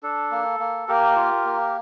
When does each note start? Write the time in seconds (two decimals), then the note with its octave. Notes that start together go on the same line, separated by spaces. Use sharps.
0.03 D4 A4
0.31 A#3
0.60 A#3
0.88 A#3 G4 A#4
1.16 F4
1.45 A#3